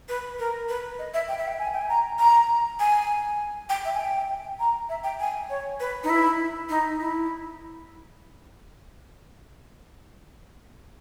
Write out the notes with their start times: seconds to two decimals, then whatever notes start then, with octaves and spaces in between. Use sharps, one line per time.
0.09 B4
0.39 A#4
0.69 B4
0.99 D#5
1.14 E5
1.29 G5
1.38 E5
1.48 G5
1.59 G#5
1.74 G5
1.81 G#5
1.89 A#5
2.19 A#5
2.80 G#5
3.69 G5
3.85 E5
3.95 G#5
4.00 G5
4.60 A#5
4.89 E5
5.04 G5
5.20 G#5
5.50 C#5
5.80 B4
6.04 D#4
6.09 E4
6.69 D#4
7.00 E4